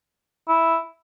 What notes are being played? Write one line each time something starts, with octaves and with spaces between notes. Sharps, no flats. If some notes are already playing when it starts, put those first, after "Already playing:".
E4